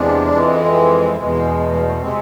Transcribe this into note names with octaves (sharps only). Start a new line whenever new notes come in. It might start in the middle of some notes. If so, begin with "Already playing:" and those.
Already playing: E2 C3 G#3 D4
F2 E3 G#3
E2 B2 G#3
B3
G#3
A3
C3 G#3 C4